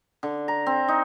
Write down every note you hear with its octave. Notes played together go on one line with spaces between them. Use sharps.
D3
A#5
C4
D#4